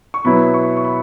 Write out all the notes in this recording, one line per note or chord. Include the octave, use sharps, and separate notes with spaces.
C#6
B2 F#3 B3 E4 B5
C#6
C#6
B5